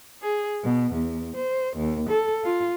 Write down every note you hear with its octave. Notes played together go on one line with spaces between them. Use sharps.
G#4
B2
E2
C5
D#2
A4
F4